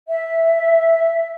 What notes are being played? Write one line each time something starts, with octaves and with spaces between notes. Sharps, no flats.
E5